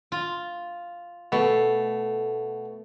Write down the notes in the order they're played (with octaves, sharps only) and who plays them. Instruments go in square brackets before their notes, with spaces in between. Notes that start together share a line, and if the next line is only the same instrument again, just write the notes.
[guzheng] F4
[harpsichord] B2 [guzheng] A3